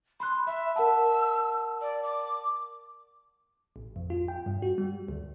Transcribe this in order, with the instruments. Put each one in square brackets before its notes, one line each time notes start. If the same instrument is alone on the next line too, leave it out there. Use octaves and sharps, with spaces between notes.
[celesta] B5 F#6 [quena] C6
[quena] E5 [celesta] B5
[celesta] A#4 F#5 A5 [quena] E6
[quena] D5
D6
[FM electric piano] A1
F2
F4
G5
G2
F#4
G3
D2